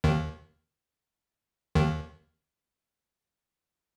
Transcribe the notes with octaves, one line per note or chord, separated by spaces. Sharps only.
D#2 D#3
D#2 D#3